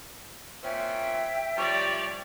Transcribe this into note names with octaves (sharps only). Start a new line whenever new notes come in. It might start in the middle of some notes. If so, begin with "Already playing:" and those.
A#2 C4 C#4 E5 G5
F3 G3 C#5 D5